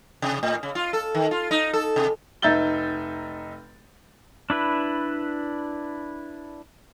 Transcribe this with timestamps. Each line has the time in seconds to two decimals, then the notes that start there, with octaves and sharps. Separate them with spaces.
0.22 C3
0.43 A2
0.63 C#3
0.75 F4
0.93 A4
1.15 D#3
1.31 F4
1.51 D#4
1.73 A4
1.96 C3
2.42 F1 D#4 E5 G6 A6 G7
4.50 D4 E4 B4